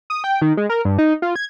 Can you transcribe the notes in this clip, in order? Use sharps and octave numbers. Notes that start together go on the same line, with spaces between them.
D#6
G5
D#3
G#3
A#4
G2
D#4
F4
G#6